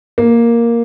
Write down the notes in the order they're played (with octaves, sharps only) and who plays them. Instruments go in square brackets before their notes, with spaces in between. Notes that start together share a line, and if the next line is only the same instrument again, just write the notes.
[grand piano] A#3